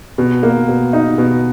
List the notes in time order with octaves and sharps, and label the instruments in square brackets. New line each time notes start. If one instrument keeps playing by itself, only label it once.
[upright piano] B2
A#3
B2
D#4
B2